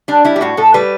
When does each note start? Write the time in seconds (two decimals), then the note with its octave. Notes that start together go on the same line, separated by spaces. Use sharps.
0.08 G3 D4
0.25 G3 E4
0.36 G4
0.41 A2 F#4
0.57 A2 A4
0.74 G3 B4